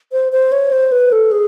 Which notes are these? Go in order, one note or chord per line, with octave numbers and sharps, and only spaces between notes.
C5
C5
C#5
C5
B4
A4
G#4